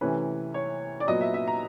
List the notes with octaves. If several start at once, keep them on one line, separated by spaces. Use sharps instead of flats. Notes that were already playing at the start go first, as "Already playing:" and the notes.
C3 E3 A3 C#4 B4
C#5
D5
A#2 F#3 B3 D#5
E5
E5
A#5